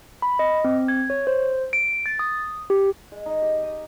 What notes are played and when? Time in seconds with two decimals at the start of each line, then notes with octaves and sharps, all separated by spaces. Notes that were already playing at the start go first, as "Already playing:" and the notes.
0.22 B5
0.39 D#5
0.64 C4
0.88 G#6
1.10 C#5
1.27 C5
1.73 D7
2.06 A6
2.19 D#6
2.70 G4
3.12 G#3
3.26 D#4
3.42 G4
3.62 D#5